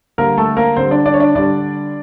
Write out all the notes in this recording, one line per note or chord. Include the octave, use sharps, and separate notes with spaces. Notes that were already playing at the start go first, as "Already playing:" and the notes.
D3 G3 A#3 A#4
A3 A4
A#3 A#4
D3 G3 C4 C5
D4 D5
D4 D5
C#5
D4 D5
D3 G3 D4 D5